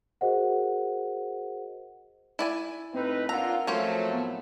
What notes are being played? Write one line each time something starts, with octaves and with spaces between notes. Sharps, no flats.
F#4 G#4 A#4 C5 D#5 F#5
E4 D5 G#5
A2 C4 D#4 B4 E6
A#3 D4 F4 F#5 A#5 E6
F3 F#3 A3 A#3 C#4 C5
A2 B3